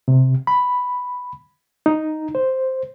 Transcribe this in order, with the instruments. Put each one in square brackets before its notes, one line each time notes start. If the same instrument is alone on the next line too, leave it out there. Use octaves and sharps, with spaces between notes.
[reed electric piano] C3
B5
D#4
C5